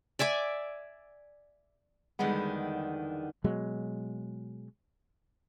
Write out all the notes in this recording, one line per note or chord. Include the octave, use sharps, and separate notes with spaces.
D5 E5 G#5 D6
E2 D3 D#3 G3 G#3 B3
B2 F#3 G#3